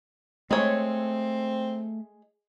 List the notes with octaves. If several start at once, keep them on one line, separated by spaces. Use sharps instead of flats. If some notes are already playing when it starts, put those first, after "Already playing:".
G#3 A3 C4 C#5